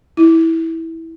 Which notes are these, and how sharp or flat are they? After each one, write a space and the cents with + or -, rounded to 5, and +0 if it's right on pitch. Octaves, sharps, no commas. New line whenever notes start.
E4 -15